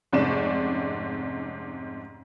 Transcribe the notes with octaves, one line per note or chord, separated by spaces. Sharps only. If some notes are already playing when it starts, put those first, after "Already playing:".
F1 G#2 C3 C#4 D5 E7